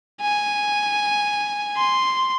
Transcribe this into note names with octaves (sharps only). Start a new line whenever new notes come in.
G#5
C6